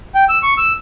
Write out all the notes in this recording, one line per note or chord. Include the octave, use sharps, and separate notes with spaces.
G5
E6
C#6
E6